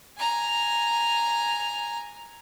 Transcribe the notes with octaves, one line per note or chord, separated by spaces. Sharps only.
G#5 A#5